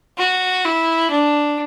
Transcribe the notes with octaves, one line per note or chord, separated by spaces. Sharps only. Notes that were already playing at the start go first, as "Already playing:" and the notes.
F#4
E4
D4